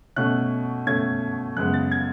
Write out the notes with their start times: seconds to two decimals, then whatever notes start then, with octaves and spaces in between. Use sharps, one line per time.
0.16 B2 A3 C#4 F#6
0.87 B2 A3 C#4 G#6
1.56 F#2 C#3 G#3 B3 F#6
1.74 A6
1.92 G#6